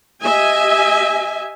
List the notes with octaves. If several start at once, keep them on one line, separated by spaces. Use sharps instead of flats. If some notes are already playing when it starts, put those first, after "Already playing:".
G4 D#5 E5 G#5